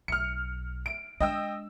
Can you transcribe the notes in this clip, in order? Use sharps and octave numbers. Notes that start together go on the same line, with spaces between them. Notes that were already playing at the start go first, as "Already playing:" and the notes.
B1 F6 C#7
D7
G#3 D4 D#5 G5 E6